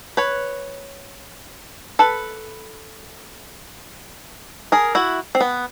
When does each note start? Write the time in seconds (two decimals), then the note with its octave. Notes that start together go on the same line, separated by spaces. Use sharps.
0.17 B4 C#5
1.99 A4 B4
4.72 G#4 A#4
4.95 E4 F#4
5.35 C4
5.41 B3